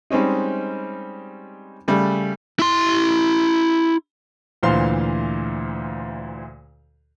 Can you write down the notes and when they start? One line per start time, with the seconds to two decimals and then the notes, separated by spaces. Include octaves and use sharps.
0.10 G3 G#3 C4 C#4 D#4
1.88 C#3 G3 A3
2.59 E4 C6
4.63 D2 A#2 E3 C5 F5 C6